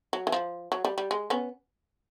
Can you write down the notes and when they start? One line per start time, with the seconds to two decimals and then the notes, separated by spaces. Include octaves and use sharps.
0.13 F#3
0.27 E3
0.32 F3
0.72 F#3
0.85 G3
0.98 G3
1.11 G#3
1.30 B3 C#4